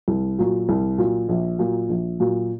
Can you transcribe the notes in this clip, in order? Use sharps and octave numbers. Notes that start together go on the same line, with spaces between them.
C2
A#2 F#3
C2
A#2 F#3
A#1
A#2 F#3
A#1
A#2 F#3